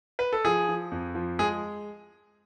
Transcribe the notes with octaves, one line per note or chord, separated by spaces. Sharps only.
B4
A4
F3 G#4
F3
F2
F3
G#3 G#4